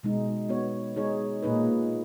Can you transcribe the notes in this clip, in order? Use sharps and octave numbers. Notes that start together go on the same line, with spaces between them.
B2 G#3 D#4
B3 F#4 C#5
G#3 D#4 G#4 C#5
A#2 A#3 D#4 G#4 B4